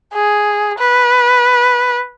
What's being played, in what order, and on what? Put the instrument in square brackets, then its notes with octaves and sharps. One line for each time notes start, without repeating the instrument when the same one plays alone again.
[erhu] G#4
B4